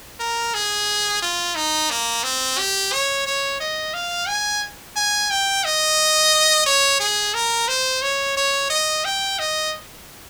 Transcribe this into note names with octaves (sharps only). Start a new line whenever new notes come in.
A#4
G#4
F4
D#4
A#3
C4
G4
C#5
C#5
D#5
F5
G#5
G#5
G5
D#5
C#5
G#4
A#4
C5
C#5
C#5
D#5
G5
D#5